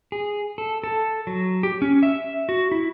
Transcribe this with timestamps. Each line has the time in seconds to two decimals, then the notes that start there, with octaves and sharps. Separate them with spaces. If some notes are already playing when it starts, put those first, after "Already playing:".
0.12 G#4
0.58 A4
0.84 A4
1.27 F#3
1.63 G4
1.82 C#4
2.03 E5
2.49 F#4
2.72 E4